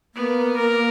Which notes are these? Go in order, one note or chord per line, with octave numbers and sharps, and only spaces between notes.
A#3 B3
A#4